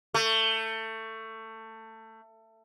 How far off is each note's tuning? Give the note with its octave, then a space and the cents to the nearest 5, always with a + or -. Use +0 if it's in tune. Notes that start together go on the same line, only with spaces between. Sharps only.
A3 +20